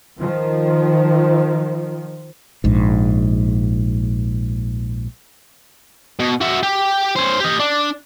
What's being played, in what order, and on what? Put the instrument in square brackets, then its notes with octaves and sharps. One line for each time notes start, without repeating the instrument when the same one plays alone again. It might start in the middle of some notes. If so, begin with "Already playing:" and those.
[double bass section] D#3 F3
[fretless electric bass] A#1 G#2
[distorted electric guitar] B2
F#4 E5
G4
C#4 C5
G4 D#5
D4